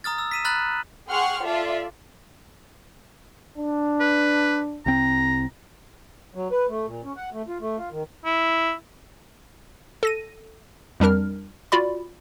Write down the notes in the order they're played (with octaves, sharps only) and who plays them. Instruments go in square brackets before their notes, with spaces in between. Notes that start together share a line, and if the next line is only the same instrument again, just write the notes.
[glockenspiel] A#5 D#6 F6 A6
E6
B6 D#7 E7
A#5 B5 F6 F#6 A6 F#7
[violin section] G#4 F#5 G5 C6 C#6 F6
F4 A4 D5 E5 F5
[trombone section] D4
[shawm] B4
[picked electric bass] C2 C4 [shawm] A#5
[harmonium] F#3
B4
A3
A#2
C#4
F#5
A3
F4
A3
F4
D#3
[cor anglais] E4
[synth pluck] A4 A#6 D#7
F2 G3 D4 A#4 F6
F4 F#4 D5 B5